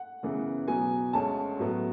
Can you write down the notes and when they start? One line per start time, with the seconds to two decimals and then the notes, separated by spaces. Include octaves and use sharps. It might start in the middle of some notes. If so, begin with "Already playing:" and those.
Already playing: F#5
0.23 F#2 C#3 E3 B3
0.68 B2 F#3 B3 G#5
1.13 D2 D3 G#3 C#4 A5
1.59 A2 F#3 B3